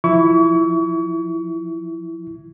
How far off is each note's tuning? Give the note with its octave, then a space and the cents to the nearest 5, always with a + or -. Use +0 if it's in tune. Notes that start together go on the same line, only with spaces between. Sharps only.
F3 +0 E4 +0 C#6 +35